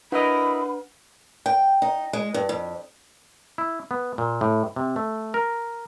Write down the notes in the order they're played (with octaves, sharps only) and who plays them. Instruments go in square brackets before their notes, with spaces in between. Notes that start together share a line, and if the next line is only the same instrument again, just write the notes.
[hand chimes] D4 B4 F#5 [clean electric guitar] E4 A#4 D#5 [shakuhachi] B5
[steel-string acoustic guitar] G5
D#4
G#3
G2
F2
[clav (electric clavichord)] E4
B3
A#2
A2
C3
A3
A#4